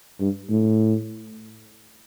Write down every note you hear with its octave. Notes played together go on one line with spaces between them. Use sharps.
G2
A2